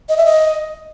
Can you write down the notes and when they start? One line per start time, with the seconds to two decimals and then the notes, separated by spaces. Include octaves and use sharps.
0.09 D#5
0.17 E5
0.25 D#5